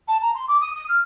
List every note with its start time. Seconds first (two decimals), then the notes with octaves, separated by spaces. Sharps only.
0.08 A5
0.22 A#5
0.35 C6
0.48 D6
0.61 D#6
0.75 D#6
0.89 F6